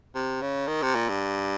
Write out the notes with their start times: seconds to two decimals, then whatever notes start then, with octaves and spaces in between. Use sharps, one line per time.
0.15 C3
0.42 C#3
0.68 D#3
0.82 C3
0.95 A#2
1.09 G2